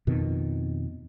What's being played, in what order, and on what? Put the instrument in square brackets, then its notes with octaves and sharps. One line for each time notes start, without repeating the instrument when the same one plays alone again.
[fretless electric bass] F2 B2 D#3